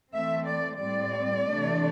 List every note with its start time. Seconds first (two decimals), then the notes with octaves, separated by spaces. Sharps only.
0.13 E3 A3 C4 E5
0.46 D5
0.80 A2 G3 C4 D5
1.48 C3 E3 A3 D4